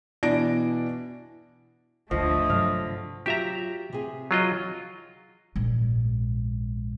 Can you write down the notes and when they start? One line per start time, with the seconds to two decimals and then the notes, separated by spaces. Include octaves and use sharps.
0.23 B2 E3 D4 A#6 D7
2.11 G#1 D2 D3 F3 A3 D#5
2.50 G2 C3 F#3 F5
3.26 F#3 F4 G4 E5 A#5
3.93 C3 G#4
4.31 F#3 F4 D#5
5.56 A#1 G#2